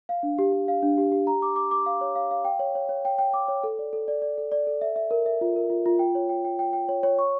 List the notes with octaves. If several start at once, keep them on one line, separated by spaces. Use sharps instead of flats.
F5
D4
G4
G4
F5
D4
G4
G4
A#5
D6
D6
D6
F5
C#5
F5
F5
G5
C#5
C#5
C#5
G5
G5
D6
C#5
A4
D5
A4
D5
D5
A4
D5
A4
E5
E5
A#4
E5
F4
A#4
F4
F4
G5
C#5
G5
G5
G5
G5
C#5
C#5
C#6